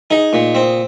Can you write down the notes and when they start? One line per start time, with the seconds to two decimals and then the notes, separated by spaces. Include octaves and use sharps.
0.10 D#4 G#4
0.33 A#2
0.55 C4